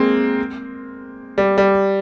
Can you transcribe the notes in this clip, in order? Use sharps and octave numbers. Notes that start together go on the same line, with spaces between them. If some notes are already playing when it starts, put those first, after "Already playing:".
Already playing: G#3 A#3 C4
G3
G3